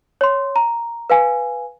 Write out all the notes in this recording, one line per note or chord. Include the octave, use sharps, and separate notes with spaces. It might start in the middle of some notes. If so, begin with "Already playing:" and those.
C#5 C6
A#5
B4 F5 G#5